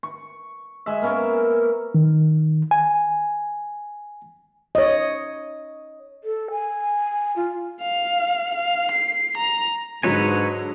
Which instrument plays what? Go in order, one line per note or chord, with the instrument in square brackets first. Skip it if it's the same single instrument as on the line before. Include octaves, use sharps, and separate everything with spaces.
[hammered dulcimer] C#6
G#3 E5
A#3 B3 C#4 A#4
[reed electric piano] D#3
G#5
[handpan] C#5 D#5
[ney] A4
G#5
F4
[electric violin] F5
F5
C7
A#5
[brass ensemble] G#2 [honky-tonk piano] D3 F#3 G#3 [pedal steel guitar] B4 C#5 G#5